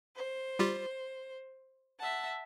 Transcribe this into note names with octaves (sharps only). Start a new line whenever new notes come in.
C5
G3 F4 G4
E5 F#5 A5